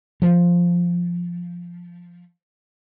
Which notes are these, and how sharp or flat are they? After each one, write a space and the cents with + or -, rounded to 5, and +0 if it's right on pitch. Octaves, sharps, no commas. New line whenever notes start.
F3 +0